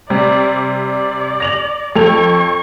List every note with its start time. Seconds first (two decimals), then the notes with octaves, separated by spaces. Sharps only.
0.10 C3 G3 D5
0.72 D5
1.40 A#6 F7 F#7
1.96 F2 A4 C#6 F7